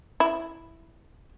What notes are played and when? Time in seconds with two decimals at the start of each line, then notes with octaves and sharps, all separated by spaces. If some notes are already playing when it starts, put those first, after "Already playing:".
0.20 E4